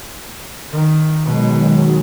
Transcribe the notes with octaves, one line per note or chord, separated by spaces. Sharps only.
D#3
B2 D#3 F#3 G#3